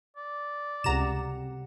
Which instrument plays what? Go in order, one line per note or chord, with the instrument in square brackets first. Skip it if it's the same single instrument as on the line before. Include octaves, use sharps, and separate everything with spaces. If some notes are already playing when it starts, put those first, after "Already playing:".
[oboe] D5
[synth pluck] C#2 A#5 E7 [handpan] C3 G4 F#5